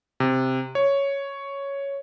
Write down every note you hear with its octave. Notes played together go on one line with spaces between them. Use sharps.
C3
C#5